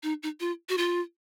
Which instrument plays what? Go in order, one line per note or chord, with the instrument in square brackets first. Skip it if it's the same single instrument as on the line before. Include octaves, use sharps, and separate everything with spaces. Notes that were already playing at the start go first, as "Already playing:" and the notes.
[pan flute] D#4
D#4
F4
F#4
F4